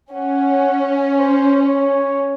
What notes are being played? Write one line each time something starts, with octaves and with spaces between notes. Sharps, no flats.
C#4 F#5
C5
C#5